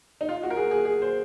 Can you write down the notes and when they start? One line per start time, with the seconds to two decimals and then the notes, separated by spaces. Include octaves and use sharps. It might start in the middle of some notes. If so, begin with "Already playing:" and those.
0.21 D#4
0.29 F4
0.43 F#4
0.50 A#4
0.56 G#4
0.71 G#4
0.85 G#4
1.02 C5